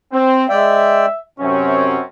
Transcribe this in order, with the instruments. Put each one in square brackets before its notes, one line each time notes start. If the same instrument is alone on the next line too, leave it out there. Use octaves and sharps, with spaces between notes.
[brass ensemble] C4
[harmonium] G#3 D5 G5 [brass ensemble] E5
[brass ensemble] F#2 C4 C#4 [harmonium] C3